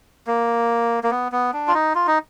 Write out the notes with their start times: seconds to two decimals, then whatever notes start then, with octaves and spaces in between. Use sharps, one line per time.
0.27 A#3
1.04 A#3
1.11 B3
1.32 B3
1.53 D4
1.68 F4
1.74 D#4
1.95 F4
2.07 D#4